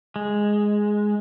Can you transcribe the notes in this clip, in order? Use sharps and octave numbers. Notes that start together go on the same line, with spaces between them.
G#3